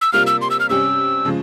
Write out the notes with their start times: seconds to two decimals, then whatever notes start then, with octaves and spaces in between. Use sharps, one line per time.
0.01 E6
0.12 C3 G3 A#3 F4 F6
0.27 E6
0.41 C6
0.50 E6
0.60 F6
0.69 C3 G3 C#4 G4 E6
1.25 C#3 F3 G#3